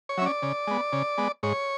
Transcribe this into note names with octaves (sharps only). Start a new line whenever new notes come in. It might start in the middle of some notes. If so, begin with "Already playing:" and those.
C#5
F#3 C#4 D5 E5
C#3
G#3 B3
C#3
G#3 B3
G#2 C#5